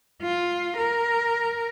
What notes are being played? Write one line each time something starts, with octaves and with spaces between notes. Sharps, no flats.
F4
A#4